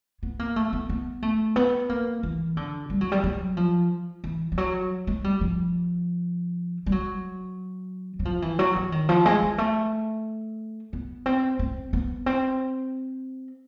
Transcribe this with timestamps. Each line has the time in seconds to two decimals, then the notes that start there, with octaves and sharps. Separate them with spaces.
0.23 B3
0.39 A#3
0.56 A3
0.73 B3
0.89 B3
1.22 A3
1.56 B3
1.89 A#3
2.23 E3
2.57 D3
2.90 G3
3.01 F#3
3.12 G3
3.24 F#3
3.57 F3
4.24 E3
4.52 F3
4.58 F#3
5.07 G#3
5.24 G3
5.41 F3
6.86 G3
6.92 F#3
8.19 F#3
8.25 F3
8.42 E3
8.59 F#3
8.76 E3
8.92 D#3
9.09 F3
9.26 G#3
9.42 G#3
9.58 A3
10.93 B3
11.26 C4
11.59 C4
11.93 B3
12.26 C4